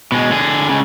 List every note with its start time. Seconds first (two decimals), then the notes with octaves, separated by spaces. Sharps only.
0.12 B2 G#3
0.31 D3 G#4
0.69 C#2 C#3